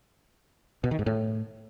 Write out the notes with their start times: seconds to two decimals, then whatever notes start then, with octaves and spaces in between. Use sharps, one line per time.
0.84 B2
0.91 D#3
0.99 G#2
1.06 A2